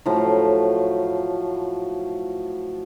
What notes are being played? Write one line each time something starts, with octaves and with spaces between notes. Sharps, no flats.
A2 F3 F#3